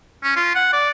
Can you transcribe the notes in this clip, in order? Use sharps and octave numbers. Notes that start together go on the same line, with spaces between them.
C#4
F4
F#5
D5